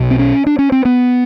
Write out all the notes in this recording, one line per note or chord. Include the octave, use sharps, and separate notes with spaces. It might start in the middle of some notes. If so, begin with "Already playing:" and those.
Already playing: B1 B2
C4
C#4
D4
C#4
C4
B3